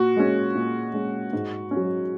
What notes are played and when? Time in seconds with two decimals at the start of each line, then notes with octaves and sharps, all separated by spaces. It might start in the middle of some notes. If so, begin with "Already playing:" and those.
Already playing: A#2 F#4
0.17 G#3 C#4
0.55 A#2
0.93 G#3 C#4
1.33 G#2
1.71 C#4
1.76 F#3